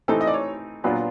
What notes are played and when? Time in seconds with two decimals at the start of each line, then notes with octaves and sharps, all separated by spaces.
0.08 E3 A3 C4 D#4 A4
0.21 D#5
0.27 D5
0.34 C#5
0.84 A#2 F#3 B3 D4 F4 B4